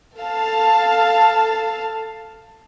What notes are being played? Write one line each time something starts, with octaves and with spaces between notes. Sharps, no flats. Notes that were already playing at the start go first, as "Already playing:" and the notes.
A4 F5 A5